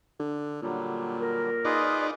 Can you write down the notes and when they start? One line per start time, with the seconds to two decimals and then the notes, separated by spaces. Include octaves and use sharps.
0.20 D3
0.62 A#2 D3 F#3 G3
1.20 A#4
1.65 D#4 F4 G#4 B4 D5